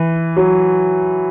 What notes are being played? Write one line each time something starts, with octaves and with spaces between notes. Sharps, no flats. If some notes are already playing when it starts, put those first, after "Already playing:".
Already playing: E3
F#3